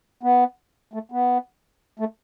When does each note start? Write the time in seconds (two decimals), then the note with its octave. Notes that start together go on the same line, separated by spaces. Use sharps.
0.23 B3
0.93 A3
1.12 B3
1.99 A3